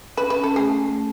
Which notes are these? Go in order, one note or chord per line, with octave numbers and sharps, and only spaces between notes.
C#4 B4
C#4 B4
A4
A3 G#4
A3